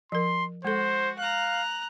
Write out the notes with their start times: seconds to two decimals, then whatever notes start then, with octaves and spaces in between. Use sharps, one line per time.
0.12 F3 A#4 C6
0.65 G#3 F#4 A4 C5
1.19 F5 A#5 F#6